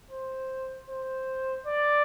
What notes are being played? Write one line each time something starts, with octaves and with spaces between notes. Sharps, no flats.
C5
C5
D5